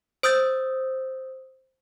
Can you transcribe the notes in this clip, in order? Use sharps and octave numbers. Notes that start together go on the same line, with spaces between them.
C5 D#6 E6 G6 A6